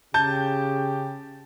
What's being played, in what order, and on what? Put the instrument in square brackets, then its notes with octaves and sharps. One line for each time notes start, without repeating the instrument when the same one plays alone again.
[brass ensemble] C#3 G4 [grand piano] A5 G6